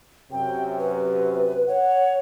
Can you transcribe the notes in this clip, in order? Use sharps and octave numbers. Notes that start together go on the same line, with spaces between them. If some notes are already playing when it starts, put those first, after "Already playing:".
F#2 C3 G5
B4
C#5 F#5